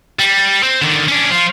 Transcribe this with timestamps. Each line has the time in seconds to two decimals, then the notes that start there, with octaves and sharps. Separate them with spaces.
0.19 G3
0.63 C4
0.82 D3 D#3
1.08 C#4 D4
1.31 F3 F4